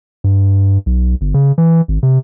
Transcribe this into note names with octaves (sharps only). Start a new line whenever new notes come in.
G2
B1
G1
C#3
E3
G#1
C3